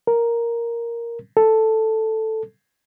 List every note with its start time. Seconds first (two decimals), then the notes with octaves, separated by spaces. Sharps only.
0.07 A#4
1.37 A4